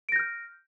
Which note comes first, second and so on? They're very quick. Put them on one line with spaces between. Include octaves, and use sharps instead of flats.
D7 A#6 G6 F6